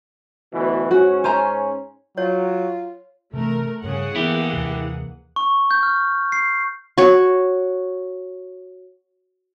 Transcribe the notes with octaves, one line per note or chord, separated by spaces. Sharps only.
D2 B2 E3
G#2 C#4 F#4
C5 G#5 A#5
F#3 F4 C#5
C3 E3 A3 A#4
G2 C#3 G#4 F#5
E3 A#3 B3 E4 G4
D#2 C3
C#6
G6
F6
C7
F#4 C#5